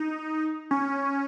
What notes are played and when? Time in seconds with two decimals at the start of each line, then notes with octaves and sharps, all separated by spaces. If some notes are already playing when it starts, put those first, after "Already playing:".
Already playing: D#4
0.71 C#4